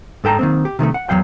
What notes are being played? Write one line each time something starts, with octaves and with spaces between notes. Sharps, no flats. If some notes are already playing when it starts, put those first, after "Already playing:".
G#2 A4 G5 A5 A#5
D#3 A#3 C4
G4
C3 D#3 G3 A3
F#5
E2 D#3 F#3 F5 G5